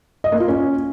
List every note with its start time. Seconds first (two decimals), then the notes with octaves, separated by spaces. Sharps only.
0.24 D#5
0.32 A#3
0.40 F4
0.48 C#4